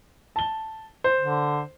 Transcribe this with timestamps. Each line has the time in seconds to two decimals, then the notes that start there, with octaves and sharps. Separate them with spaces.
0.36 A5 G7
1.04 C5
1.20 D3